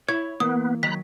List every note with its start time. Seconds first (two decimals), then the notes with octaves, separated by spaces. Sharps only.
0.09 E4 C#5 G#6
0.40 E3 A#3 B3 D#6
0.83 D#3 F#3 A#5 B5 F#6 B6